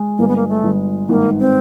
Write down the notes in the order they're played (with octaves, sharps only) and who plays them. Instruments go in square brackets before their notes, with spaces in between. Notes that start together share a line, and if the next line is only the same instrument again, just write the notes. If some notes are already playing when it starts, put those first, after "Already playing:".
Already playing: [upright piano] G#3
[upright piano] G1 [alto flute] A#3
[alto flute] B3
A#3
A3
[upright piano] G1
[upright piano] G#1 [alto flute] A#3
[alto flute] C4